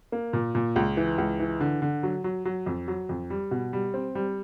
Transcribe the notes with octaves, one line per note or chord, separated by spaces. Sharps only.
A#3
A#2
A#2
C#2
E3
C#2
E3
D3
D3
F#3
F#3
F#3
F2
F#3
F2
G3
B2
G3
C4
G3